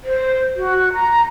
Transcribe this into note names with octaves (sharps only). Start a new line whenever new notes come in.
C5
F#4
A#5